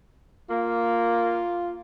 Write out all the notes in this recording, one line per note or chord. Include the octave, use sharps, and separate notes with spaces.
A#3 F4